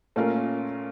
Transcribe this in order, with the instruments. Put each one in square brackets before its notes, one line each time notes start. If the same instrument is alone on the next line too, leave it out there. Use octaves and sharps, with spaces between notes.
[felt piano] A#2 A3 C#4 F4 A#4